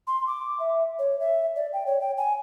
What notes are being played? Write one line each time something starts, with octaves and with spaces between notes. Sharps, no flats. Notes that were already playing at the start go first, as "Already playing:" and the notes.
C6
D6
E5
C#5
E5
D5
G5
C#5
G5
G#5